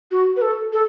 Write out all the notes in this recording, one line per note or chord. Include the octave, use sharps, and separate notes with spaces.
F#4
B4
A4
A4